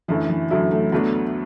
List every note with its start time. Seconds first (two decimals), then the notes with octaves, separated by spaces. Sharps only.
0.08 F#2 D3 E3 A3 E4
0.29 E3
0.50 F#2 D3 F#3 A3 E4
0.71 A3
0.92 D2 D3 F#3 A3 B3 D4